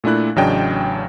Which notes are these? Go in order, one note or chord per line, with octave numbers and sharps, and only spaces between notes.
A#2 A3 D4 E4 F#6
A1 C#3 F#3 D4 D#5 G5